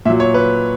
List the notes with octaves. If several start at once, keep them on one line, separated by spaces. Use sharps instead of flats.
A#2 F#3 E5
C#5
B4